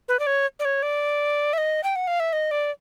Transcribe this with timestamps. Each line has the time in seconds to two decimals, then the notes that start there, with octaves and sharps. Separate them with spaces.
0.08 B4
0.19 D5
0.27 C#5
0.59 D5
0.65 C#5
0.83 D5
1.53 E5
1.58 D#5
1.83 G5
1.96 F#5
2.07 F5
2.20 E5
2.33 D#5
2.51 D5